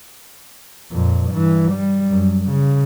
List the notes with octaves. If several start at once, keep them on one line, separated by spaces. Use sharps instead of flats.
F2 A#2
G2 E3
G3
F#2
C#3